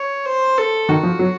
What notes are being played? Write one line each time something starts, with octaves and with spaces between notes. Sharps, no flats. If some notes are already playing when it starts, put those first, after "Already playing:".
Already playing: C#5
C5
A4
D#3 F#4
F3
F#3